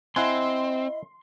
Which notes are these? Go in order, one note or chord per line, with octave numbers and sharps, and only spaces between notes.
C4 E4 D#5 F#5 G#5 C6